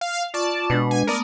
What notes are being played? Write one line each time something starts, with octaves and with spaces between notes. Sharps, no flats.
F5
F4 D5 A5 C#6 D6
B2 G#3 D4 B4
G#5
A3 B3 A#4 D5 D#6